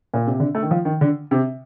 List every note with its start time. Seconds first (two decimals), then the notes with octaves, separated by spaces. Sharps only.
0.14 A#2
0.27 C3
0.40 D3
0.55 A3
0.63 D#3
0.71 F3
0.85 D#3
1.01 D3
1.31 C3